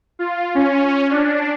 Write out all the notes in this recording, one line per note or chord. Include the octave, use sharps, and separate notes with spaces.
F4
C#4
D4